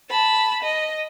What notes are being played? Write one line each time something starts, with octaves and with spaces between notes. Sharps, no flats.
A5 B5
D#5